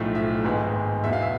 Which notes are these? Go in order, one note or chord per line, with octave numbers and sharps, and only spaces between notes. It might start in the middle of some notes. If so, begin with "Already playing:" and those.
Already playing: B1 A2 F3 A3
E5
G#1 G#2 G#3 B3
E2 B2 B3 E5
F5
E5